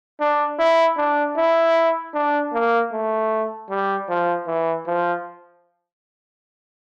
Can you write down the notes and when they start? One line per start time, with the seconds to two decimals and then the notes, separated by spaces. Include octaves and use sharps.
0.20 D4
0.59 E4
0.97 D4
1.36 E4
2.14 D4
2.53 A#3
2.92 A3
3.69 G3
4.08 F3
4.47 E3
4.86 F3